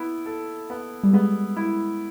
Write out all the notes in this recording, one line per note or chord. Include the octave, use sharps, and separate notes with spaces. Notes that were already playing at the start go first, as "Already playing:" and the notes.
Already playing: B3 E4
A4
B3
G3
G#3 B3
E4